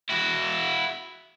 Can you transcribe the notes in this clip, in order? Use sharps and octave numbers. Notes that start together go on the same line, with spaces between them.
E4 F#4